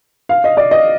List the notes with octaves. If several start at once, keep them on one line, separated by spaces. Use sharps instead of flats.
F5
D#5
D5
D#5